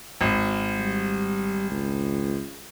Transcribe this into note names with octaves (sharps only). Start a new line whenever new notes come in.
G#1
G3
C#2